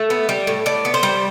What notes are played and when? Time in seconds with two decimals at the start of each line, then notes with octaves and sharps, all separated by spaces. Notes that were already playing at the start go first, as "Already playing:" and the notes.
Already playing: A3 E5
0.10 B3
0.29 G3
0.47 A2
0.66 A2 D5
0.85 B3
0.94 C5
1.03 G3